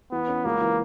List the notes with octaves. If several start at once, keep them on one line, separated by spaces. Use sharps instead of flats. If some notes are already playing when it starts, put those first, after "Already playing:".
E3 B3
C#4
C#2 A#3
E3